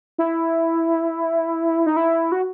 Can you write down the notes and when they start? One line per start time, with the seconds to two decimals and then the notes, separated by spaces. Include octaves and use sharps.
0.18 E4
1.86 D#4
1.96 E4
2.32 F#4